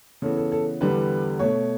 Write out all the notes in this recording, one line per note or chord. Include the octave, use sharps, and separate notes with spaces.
C#3 E3 B3 A4
A4
A4
E2 D3 G3 B3 B4
B2 A3 C#5